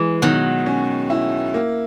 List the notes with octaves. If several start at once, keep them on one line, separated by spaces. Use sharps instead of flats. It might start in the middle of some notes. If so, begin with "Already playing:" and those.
Already playing: E3 G#3
B2 D#3 F#3
C#4
E4
A#3